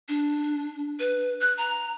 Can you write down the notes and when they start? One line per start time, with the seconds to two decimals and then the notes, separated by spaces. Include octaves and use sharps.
0.09 D4
1.00 B4
1.41 F#6
1.58 A#5